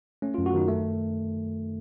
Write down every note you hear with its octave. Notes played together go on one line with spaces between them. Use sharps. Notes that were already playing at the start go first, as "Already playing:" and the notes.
A3 C#4
F#2 F4
F#4
D#3 D#4
A3